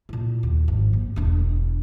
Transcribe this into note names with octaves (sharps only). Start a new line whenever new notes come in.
A#2 E4
D#2
G#1 F2
A#3
E1 D4